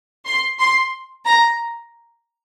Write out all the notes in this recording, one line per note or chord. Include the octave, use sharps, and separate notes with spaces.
C6
C6
A#5